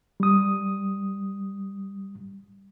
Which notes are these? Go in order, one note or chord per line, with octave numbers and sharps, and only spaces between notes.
G3 D#6